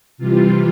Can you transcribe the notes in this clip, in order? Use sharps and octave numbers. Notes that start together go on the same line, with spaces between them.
C3 E3 G3 F4